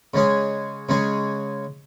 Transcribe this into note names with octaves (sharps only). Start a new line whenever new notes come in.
C#3 G#3 C#4 G#4
C#3 G#3 C#4 G#4